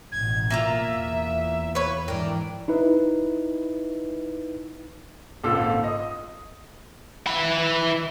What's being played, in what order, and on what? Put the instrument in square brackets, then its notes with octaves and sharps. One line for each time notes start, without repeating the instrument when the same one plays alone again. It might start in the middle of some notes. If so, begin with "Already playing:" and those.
[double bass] A1 B2 [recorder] G#6
[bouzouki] A#3 F4 A#5 [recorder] E5
[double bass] E2
[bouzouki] B4 C#5
[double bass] G#2 E3 [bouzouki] D4 A#4 [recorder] G5
[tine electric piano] D#4 E4 B4
[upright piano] G#1 C#2 A#2 F4 A4 E6
D#5 D#6
[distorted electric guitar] E3 B5